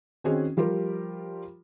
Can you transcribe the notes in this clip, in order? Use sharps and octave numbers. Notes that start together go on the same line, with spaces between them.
D#3 C4 C#4 F#4 G#4 D#5
F3 G3 F4 G4 A#4